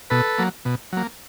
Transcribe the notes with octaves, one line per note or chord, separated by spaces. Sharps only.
B2 A4 B4
F#3 A#3
B2
F#3 A#3